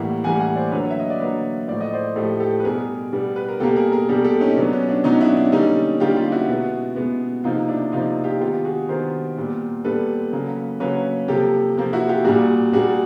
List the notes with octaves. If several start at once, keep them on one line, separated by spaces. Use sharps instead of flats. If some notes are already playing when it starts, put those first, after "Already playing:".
Already playing: A2 E3 G3 A#3 E5 F#5
A2 E3 G3 A#3 F#5 G#5
F#5 G#5
C5 D5
D3 F#3 A#3 B4 C#5
E5
D#5
D5
D3 F#3 A#3 B4 C#5
A2 F3 A3 D5
D#5
C5 D5
A2 F3 A3 G4 A4
G4 A4
B4
B2 G3 B3 G#4 A#4
B2 G3 B3
B4
A#4
B2 G3 A#3 G4 A4
G#4 A#4
G#4 A#4
B2 G3 A#3 G4 A4
G4 A4
C#4 D#4
B2 F#3 B3 D4
C#4
D4
B2 F#3 B3 C#4 D#4
D4 E4
D4
D3 G3 A#3 C#4 D#4
D3 G3 A#3 F4 G4
F4 G4
E4 F#4
B2 G#3 B3
B2 G#3 B3
C3 F3 A#3 D#4 F4
D4 E4
C3 F3 A#3 D#4 F4
F4 G4
D#3 G#3 B3 F4 G4
F#4 G#4
D#3 G#3 B3 A#4 C5
A#2 G3 B3
A#2 G3 B3 A4 B4
C#3 F#3 A#3
C#3 F#3 A#3 B4 C#5
C3 F3 A#3 G4 A4
C3 F3 A#3
E4 F#4
F4 G4
A#2 G3 A#3 F#4 G#4
A#2 G3 A#3 F#4 G#4